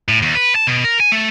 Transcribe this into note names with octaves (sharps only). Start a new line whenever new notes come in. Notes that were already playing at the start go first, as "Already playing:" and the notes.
A2
D#2
B4
A5
B2
A#4
G#5
A3